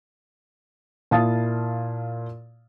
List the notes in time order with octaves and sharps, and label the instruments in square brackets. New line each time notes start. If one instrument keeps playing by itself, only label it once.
[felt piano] A#2 E4 F5 A5 D#6 A6